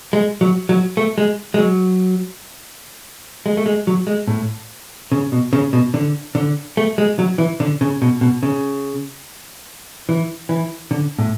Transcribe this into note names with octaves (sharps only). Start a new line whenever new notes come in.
G#3
F#3
F#3
A3
G#3
G#3
F#3
G#3
A3
G#3
F#3
G#3
A2
C#3
B2
C#3
B2
D3
D3
A3
G#3
F#3
E3
D3
C#3
B2
B2
C#3
E3
E3
D3
A2